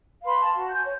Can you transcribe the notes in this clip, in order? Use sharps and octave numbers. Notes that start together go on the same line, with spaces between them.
B4 F5 B5 C6
A5
F#4
G#5 G6
C#5